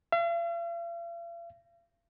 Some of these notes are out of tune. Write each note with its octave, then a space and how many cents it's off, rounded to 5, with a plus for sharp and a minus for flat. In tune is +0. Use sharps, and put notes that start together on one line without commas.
F5 -45